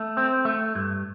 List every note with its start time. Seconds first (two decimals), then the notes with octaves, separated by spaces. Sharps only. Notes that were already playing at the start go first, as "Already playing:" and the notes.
Already playing: A3
0.17 C4
0.45 A3
0.75 G2